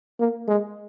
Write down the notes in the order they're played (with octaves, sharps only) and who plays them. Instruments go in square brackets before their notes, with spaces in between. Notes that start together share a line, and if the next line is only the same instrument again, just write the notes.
[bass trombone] A#3
G#3